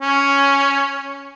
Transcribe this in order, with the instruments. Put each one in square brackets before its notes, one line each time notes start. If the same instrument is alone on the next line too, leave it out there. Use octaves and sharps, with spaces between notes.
[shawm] C#4